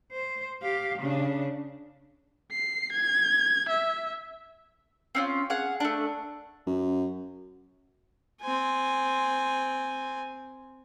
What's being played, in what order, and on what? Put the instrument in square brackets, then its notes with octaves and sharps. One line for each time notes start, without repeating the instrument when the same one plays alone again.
[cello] C5
G4 F5
C#3 D4
[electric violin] C7
G#6
E5
[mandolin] C4 C#4 F4
G#4 F5 F#5
A3 D4
[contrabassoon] F#2
[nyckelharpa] C4 G#5